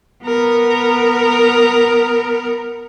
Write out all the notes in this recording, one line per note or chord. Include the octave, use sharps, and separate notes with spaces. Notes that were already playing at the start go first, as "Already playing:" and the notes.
B3 A#4